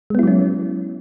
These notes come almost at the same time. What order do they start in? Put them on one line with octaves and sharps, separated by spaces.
G#3 B3 E4 F#3 C#4